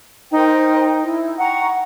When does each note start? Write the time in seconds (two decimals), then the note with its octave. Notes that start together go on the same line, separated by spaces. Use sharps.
0.32 D#4 A#4 C5 G5
1.02 E4
1.38 F#5 G5 A#5 C#6